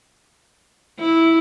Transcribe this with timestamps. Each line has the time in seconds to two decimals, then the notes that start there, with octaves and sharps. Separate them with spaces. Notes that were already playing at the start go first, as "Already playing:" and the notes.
0.99 E4